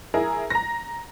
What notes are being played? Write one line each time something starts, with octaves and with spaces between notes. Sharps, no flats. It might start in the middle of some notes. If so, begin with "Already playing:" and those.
E4 G#4 A#4 A#5
A#5 A#6